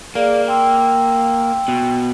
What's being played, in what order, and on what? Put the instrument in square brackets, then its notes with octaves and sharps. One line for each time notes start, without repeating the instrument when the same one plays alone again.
[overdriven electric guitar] A#3 [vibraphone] G#4 D5 F5
[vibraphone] G5 C6 E6
[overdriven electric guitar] B2